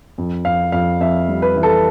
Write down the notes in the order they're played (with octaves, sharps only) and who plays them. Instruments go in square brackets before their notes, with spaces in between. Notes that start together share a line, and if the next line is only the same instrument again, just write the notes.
[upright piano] F2
F2 F5
F2 F5
F2 E5
G3
B4
E3
A4